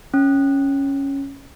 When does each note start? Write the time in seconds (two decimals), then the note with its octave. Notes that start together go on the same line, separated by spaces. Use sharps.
0.14 C#4